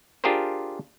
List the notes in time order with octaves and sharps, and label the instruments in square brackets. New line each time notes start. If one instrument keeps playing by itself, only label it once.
[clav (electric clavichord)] D4 F4 G4 G#4 A#4 C5